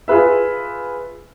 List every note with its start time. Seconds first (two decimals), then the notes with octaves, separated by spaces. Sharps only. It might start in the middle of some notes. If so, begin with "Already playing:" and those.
0.08 F4 G#4 B4 E5